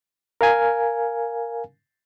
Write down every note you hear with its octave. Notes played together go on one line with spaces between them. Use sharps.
A#4 F5 G#5